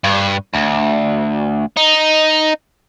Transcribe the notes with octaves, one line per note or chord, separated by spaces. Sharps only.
G2
D2
D#4